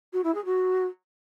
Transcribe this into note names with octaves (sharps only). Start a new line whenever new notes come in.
F#4
E4
G#4
F#4